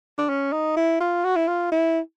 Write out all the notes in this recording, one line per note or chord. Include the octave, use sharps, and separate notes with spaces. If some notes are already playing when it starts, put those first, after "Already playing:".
D4
C#4
D#4
E4
F4
F#4
E4
F4
E4